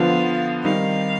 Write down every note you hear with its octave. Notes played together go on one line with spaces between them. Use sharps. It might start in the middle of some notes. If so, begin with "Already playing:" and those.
Already playing: D3 F3 B3 F4 F5
D#3 G3 C4 D#4 F5